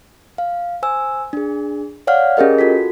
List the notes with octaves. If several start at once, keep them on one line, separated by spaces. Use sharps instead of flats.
F5
C5 G#5 E6
D4 G#4
C#5 D5 F5 F#5 F6
C#4 G4 G#4 A#4 D#5
F4 F#4 A4 B6